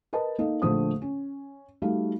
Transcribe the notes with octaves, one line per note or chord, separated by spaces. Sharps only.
A#4 B4 D#5 A5
A#3 D#4 A4 D#5
A#1 D3 F3 A3 C5 D#6
C#4
G3 A3 D#4 F#4 F5